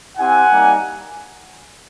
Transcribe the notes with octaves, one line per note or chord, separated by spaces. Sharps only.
C4 E4 G4 F#5 G#5
G3 A#3 D#4